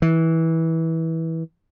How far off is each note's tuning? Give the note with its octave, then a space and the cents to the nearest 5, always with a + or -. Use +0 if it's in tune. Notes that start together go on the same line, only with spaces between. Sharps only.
E3 -20